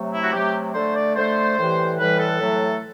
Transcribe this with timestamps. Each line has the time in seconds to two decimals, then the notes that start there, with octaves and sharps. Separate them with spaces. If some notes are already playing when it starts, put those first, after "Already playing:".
Already playing: C3 F#3 A3
0.12 E4
0.24 F#4
0.32 C3 F#3 A3 G4
0.74 D3 A3 C5
0.95 D5
1.16 D3 A3 C5
1.58 A2 E3 G3
1.99 A2 E3 G3 B4
2.20 A4
2.41 A2 F#3 A3